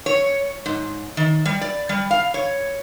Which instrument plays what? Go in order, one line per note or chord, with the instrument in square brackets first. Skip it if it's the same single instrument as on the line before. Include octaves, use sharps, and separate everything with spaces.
[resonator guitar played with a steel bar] C#5
G#2
D#3
G3
D5
G3
F5
C#5